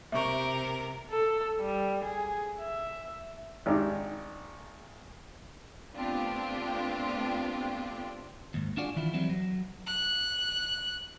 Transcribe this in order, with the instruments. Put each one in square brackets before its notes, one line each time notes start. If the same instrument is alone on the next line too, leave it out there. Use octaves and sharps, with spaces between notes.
[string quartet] C3 A#4 [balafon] E5 C#6
[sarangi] A4
G3
G#4
E5
[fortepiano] G#1 D4 D#4 G4
[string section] A3 B3 C4 D4 F4 G4
[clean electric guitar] D#2 G#2
D4 F4 F#4 G#4 D5
D#3 E3 E4 F4
E3 F#3 G3 C4 E4
F#3
[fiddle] F#6